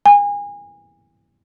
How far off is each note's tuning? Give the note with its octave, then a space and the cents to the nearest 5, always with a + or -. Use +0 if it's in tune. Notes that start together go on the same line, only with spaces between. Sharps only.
G#5 -30